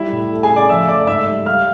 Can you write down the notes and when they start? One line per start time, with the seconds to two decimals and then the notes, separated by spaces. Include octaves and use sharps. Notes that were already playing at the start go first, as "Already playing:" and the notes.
Already playing: G3 E4 E5
0.12 A2
0.32 A3
0.43 G#4 G#5
0.51 C#3
0.56 D5 D6
0.69 F3 E5 E6
0.88 A3 D5 D6
1.07 G#2 E5 E6
1.27 G3
1.45 G3 F5 F6